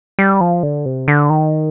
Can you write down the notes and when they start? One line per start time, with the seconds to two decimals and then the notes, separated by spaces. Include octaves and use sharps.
0.19 G3
0.41 F3
0.63 D3
0.86 C3
1.08 D3
1.30 D#3